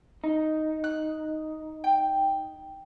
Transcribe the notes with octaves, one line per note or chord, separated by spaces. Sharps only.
D#4
F#6
G5